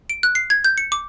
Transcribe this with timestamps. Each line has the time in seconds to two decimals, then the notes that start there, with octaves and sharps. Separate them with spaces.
0.10 D7
0.23 F#6
0.35 C7
0.50 G#6
0.65 G6
0.78 C#7
0.92 D6